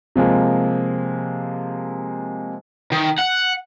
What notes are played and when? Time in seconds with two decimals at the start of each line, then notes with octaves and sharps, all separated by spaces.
0.15 C3 F3 G#3 A#3
2.92 D#3
3.19 F#5